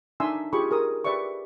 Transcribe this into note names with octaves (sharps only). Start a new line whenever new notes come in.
D4 D#4 E5 G#5 C6 E6
F4 G4 G#4 B5 C#6
G#4 A#4 D#6
G4 B4 D5 E5 C#6